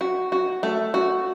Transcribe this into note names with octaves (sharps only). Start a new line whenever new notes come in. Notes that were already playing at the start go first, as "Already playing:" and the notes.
F#4
F#4
A3
F#4